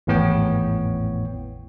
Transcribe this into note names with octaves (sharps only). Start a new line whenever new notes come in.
G#1 E2 A2 B3 C#5 G5